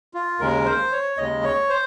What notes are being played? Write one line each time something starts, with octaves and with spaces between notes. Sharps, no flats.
F4
D#2 C#3 G#3 A#4
C5
C#5
D#2 C#3 G#3 D#5
C#5
C5